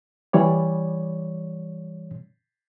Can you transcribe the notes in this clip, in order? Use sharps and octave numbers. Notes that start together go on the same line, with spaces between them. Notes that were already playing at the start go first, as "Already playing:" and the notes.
E3 G3 C#5 D5